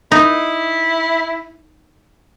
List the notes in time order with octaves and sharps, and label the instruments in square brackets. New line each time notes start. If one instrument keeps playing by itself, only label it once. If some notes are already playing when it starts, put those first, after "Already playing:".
[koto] D#4 [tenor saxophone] E4